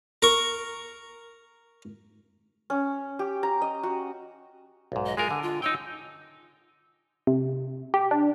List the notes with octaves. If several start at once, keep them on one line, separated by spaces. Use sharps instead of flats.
A#4 C#6
C#4
G4
A#5
D#5
F#4
B1 G#2
D#5
G#3 F4 A#4 G#5
D3
F4
D#4 C#5 G5 E6
C3
G4
D4